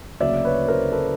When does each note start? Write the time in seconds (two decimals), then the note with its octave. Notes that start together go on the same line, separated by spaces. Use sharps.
0.20 D2 C#3 F#3 A#3 D5 E5
0.44 B4 C#5
0.68 A#4 C5
0.92 A4 B4